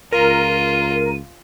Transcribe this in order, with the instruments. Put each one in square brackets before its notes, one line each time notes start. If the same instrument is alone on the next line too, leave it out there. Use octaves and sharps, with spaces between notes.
[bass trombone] C#2 [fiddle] F4 [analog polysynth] A#4 [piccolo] D#7